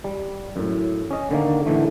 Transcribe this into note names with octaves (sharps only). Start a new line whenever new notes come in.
G3
F#2 A2
C#4 D#5
D3 D#3 A#3
A2 D3 E3 A3